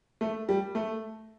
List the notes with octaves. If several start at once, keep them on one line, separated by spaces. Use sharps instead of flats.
A3
G3
A3